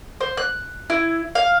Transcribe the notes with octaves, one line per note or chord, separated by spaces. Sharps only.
C5
F#6
E4
F5